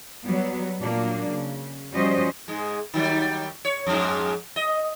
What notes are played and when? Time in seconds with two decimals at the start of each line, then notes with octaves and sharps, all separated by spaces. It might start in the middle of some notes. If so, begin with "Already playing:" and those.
0.25 F#3 G3 B3
0.81 A#2 F#3 A#3 D4
1.30 C#3
1.92 F3 G3 C#4 F#4 C5 D#5
2.48 G#2 G#3
2.94 D#3 F#3 G3
3.65 C#5
3.87 F2 G#2
4.56 D#5